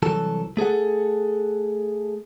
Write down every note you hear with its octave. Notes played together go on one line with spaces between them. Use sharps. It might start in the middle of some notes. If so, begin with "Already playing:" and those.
C2 E3 F#3 A4
A3 G#4 A4 F#5